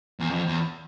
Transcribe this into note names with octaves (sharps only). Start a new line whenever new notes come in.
E2
F2
E2